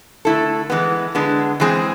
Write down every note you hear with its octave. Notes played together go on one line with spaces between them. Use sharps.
D3 A3 E4 A4
E3 G#3 B3
D3 G#3 B3 D4
E3 G#3 C4 G#4